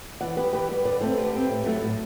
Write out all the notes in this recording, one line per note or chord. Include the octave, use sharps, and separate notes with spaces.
E3 D5 F#5
G3 B3 G4 B4
E3 G4 B4
G3 B3
D3 B4 D5
A3 C4 A4 C5
D3 G4 B4
A3 C4
A2
F#3 A3
A2